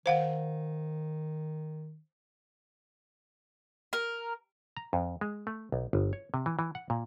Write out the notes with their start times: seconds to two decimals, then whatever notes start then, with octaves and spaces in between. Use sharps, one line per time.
0.06 D#3 C5 F5 F#5
3.93 A#4
4.77 A#5
4.93 F2
5.21 G#3
5.47 A3
5.72 B1
5.93 G1
6.13 C#5
6.34 C3
6.46 E3
6.59 E3
6.75 F#5
6.90 A#2